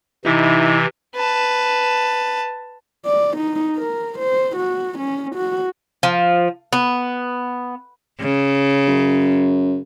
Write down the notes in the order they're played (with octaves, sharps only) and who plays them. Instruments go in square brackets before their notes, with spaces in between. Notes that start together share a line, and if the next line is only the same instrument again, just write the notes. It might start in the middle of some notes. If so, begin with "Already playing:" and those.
[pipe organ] C3 E3 [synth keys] D#4 E4
[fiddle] B4 A5
[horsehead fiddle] D5
D#4
A#4
C5
F#4
C#4
F#4
[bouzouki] F3
B3
[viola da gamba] C#3
[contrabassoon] F#2